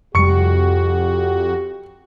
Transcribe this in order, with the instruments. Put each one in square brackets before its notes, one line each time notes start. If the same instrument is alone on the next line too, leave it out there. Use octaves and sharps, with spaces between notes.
[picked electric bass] F1 G3 [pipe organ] F2 F#4 [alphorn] G4 [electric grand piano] C#6 C#7